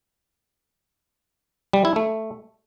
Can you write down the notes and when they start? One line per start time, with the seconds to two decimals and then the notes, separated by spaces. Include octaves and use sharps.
1.73 G3
1.85 E4
1.96 A3